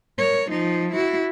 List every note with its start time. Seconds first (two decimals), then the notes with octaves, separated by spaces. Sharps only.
0.18 A#4 C#5
0.49 F3 D#4
0.92 E4 F#4